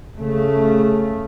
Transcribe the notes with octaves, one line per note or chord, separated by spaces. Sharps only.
C#3 A3